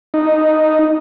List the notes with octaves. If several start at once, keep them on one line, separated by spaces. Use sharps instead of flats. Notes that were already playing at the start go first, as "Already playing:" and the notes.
D#4